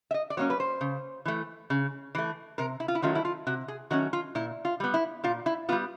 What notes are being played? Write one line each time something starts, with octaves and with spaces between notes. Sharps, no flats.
E5
D#5
D5
F#3 A#3 C#4 C#5
B4
C5
C#3
E3 A3
C#3
E3 A3
C3 A#4
E4
F4
E4
D#3 F#3 A3 C#4 F4
E4
F4
C3 F#4
G#4
D#3 F#3 A3 C#4 F#4
F4
A#2 E4
F4
G3 B3
E4
A#2 F4
E4
G3 B3 F4